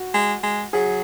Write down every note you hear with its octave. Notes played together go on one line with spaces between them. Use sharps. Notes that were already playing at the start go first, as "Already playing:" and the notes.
Already playing: F#4
G#3
G#3
F#3 G#4